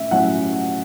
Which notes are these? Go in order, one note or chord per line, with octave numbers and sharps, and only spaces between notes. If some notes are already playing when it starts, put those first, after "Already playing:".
Already playing: A2 C#4 E5
A2 F#3 C#4 F#5